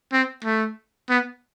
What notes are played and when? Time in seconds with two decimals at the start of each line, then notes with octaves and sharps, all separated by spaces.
0.13 C4
0.44 A3
1.09 B3